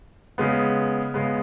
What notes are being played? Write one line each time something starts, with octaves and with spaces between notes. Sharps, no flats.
C#3 G#3 B3
C#3 G#3 B3